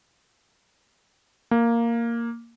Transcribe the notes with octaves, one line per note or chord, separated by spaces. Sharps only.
A#3